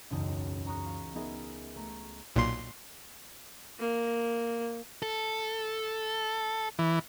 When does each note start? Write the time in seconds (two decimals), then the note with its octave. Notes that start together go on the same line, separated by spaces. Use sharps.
0.10 E1 C#2 F#2 D#4 A5
0.67 A#5 C#6 D#6 F#6
0.86 F5
1.15 B3 D#4 G#4 A#4 E5
1.75 A3 A#5 C#6 B6
2.36 B1 A#2 C6
3.79 A#3
5.02 A4
6.79 E3